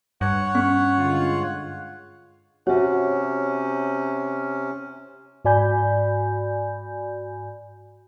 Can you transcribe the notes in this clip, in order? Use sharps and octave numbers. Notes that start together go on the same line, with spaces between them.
G2 C#5 F#5
C#4
D3 G#3 F4
C3 C#4 F#4 C#5 E5
G#2 F#4 D5 G#5 B5 G6